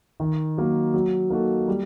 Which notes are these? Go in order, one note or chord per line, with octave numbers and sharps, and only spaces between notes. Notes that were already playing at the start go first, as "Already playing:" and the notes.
D#3
F#3 A#3
F#3
A#3 D#4 F#4 A4
G3